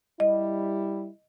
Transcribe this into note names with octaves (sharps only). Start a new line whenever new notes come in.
G3 E4 D#5